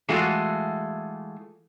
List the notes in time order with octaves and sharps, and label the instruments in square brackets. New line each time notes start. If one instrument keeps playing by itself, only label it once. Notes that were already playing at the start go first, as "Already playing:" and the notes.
[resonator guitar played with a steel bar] E3 G#3 A3 F4 F#4